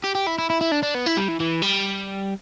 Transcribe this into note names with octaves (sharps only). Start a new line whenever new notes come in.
G4
G4
E4
E4
E4
E4
D4
D4
B3
E4
G3
E3
E3
G3